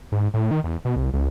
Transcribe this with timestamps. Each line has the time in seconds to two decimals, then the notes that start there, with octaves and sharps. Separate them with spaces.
0.12 G#2
0.34 A2
0.51 D#3
0.64 E2
0.85 B2
0.96 C2
1.13 C#2